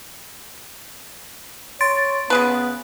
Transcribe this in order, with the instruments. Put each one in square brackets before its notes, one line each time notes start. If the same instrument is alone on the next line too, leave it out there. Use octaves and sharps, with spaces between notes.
[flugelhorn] C#5 [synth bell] C6 A6 D7
[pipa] C#3 G#4 B4 [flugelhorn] B3